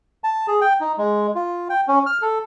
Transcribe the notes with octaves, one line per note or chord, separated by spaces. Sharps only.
A5
G#4
G5
D#4
G#3
F4
G5
C#4
F6
A4